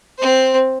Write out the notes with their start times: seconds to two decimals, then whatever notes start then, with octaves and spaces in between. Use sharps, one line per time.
0.18 C4 C5